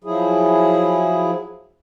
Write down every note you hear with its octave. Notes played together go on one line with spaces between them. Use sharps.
F3 F#3 E4 G#4